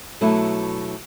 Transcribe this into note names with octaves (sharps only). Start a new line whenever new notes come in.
B2 F#3 A3 B3 D4 E4